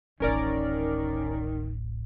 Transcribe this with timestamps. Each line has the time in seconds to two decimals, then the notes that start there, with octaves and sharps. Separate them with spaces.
0.20 D1 A1 D#3 C#4 A#4 D5